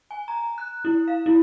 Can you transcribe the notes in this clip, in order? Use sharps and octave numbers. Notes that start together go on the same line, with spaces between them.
G#5
A#5
F#6
E4
F5
E4